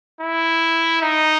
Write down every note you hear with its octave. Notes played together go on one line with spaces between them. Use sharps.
E4
D#4